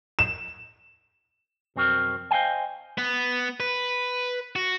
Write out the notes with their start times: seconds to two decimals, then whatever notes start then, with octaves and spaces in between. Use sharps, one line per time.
0.19 E7
1.76 B1 F2 C4 F#4 A#4
2.31 C5 D#5 F5 G5 G#5
2.98 B3
3.60 B4
4.56 F#4